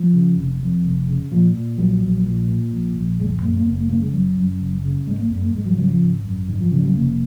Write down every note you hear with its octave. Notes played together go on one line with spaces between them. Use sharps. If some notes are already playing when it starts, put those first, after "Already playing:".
Already playing: F3
C#3
F1
F2
F1
C#3
A#2 F3
A#2
A#1 F#3
A#1
A#2
A#2
A#1
A#1
F#1 G#3
F#2 A#3
A#3
F#1 B3
A#3
C#3 A#3
G#3
F#1 F#3
F#2
F#1
C#3
G#1 G#3
A#3
F#2 B3
A#3
G#1 G#3
F#3
F3
C#3 F#3
F3
G#1
F#2
G#1 D#3
F3
C#3 F3
F#3
F1 A#3